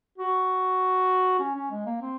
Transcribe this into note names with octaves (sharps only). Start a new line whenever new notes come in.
F#4
C#4
C#4
G#3
A#3
C4